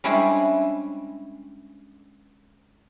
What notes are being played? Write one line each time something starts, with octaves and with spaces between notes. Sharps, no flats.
G3 G#3 C#4 D4 E4 C5